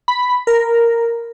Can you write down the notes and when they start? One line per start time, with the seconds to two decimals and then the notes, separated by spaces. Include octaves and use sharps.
0.08 B5
0.47 A#4